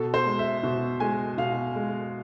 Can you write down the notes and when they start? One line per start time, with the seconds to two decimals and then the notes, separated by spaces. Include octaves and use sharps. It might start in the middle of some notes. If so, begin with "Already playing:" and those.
Already playing: B2 A4
0.14 C5
0.26 G#3
0.39 E5
0.63 B2
1.00 G#3 G#5
1.38 B2 F5
1.75 G#3